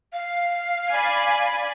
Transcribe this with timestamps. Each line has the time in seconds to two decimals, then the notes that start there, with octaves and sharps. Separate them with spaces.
0.13 F5
0.92 D5 G#5 B5